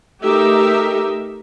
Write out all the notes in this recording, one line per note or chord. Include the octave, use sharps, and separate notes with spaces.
A3 D#4 G4 A#4 E5